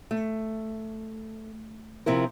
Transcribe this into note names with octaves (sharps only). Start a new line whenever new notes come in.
A3
C3 F3 E4 A#4